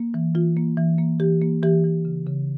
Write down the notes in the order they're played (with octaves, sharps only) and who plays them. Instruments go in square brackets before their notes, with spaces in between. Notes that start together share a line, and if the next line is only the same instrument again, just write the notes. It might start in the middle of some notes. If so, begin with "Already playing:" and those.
Already playing: [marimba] A#3
E3
E3 F4
A#3
E3
A#3
E3 G4
A#3
E3 G4
E3
C#3
C#3